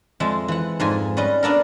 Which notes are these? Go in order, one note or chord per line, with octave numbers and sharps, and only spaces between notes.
F2 G#3 E5
E3 F#5
F2 G#2 G#5
G3 C#4 B4 D#5
B3 D4 A4 A#4